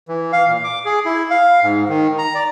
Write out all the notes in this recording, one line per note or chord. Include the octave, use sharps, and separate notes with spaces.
E3
F5
A#2
D6
G#4
E4
F5
G#2
D#3
A#5
D5